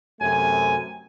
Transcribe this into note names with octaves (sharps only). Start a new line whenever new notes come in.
F#2 C3 A3 G#5